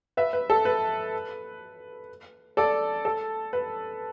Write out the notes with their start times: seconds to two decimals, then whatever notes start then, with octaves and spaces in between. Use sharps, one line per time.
0.17 B4 E5
0.33 B4
0.50 A4
0.65 B4
2.57 A4 D5
3.05 A4
3.53 B4